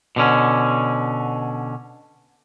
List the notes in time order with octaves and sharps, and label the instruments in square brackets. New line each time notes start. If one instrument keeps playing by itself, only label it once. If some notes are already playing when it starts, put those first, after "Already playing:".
[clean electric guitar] B2 D3 C#4